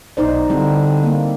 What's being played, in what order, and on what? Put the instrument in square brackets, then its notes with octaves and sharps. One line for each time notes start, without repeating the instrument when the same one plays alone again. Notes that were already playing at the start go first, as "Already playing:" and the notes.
[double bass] B1 [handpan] D#4 C5 D5
[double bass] D3 [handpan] G3 C4 E4
[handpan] A#3